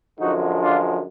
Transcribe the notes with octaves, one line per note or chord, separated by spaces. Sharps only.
F#2 D3 F3 G#3 D#4 F#4
D4 F4